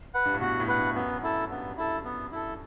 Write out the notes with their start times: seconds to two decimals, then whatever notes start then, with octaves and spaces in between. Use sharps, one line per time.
0.14 B4 F#5
0.25 G2
0.34 A2
0.41 B2 F#4
0.60 A2
0.68 B4 F#5
0.78 G2
0.96 F#2 B3
1.23 E4 A4
1.50 G2 B3
1.77 E4 A4
2.05 B3
2.32 E4 A4